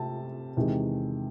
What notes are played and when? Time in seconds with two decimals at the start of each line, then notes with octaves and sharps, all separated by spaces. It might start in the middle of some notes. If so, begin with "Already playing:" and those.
Already playing: C3 A3 A5
0.57 E2 C3 D#3 G#3